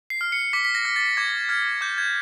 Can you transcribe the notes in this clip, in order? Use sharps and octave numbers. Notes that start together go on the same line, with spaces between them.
C7
F6
C#7
D6 B6
B6
A#6
F6
A6
D6 G#6
F6 G#6
D6 G6
G#6